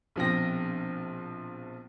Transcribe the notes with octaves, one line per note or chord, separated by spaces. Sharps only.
A#1 B2 F3 C4 G5 A#6